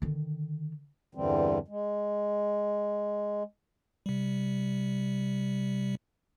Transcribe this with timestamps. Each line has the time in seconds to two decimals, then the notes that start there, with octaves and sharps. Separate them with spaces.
0.02 D3 D#3
1.15 E2 G2 D3 E3 G3 C4
1.68 G#3
4.06 C3 G3